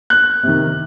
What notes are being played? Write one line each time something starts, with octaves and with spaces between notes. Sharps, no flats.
F#6
C3 D#3